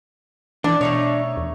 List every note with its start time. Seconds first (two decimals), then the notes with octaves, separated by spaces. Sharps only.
0.64 E3 D4 D5
0.81 B2 A3 D#4 C#5
1.37 E2